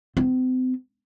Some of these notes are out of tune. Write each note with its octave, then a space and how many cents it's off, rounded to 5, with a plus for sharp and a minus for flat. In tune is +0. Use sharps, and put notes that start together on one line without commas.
C4 -40